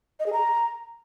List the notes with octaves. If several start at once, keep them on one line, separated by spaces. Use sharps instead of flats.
D#5
G#4
A#5